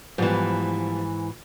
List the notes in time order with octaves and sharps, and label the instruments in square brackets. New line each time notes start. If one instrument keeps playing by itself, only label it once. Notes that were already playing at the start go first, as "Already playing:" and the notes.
[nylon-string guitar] G#2 E3 [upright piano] F3 G3 B3